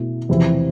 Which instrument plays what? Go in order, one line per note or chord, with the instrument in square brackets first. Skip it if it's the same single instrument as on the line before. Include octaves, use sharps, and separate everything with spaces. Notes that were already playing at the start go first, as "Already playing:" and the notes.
Already playing: [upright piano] B2 A3 E4
E2 C3 F3 C4 E4